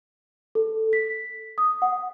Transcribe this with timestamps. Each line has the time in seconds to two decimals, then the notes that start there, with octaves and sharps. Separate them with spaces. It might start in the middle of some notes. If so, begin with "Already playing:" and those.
0.55 A4
0.93 B6
1.58 D#6
1.82 F#5